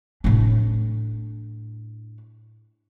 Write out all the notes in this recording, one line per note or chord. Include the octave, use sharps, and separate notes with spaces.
A2 D4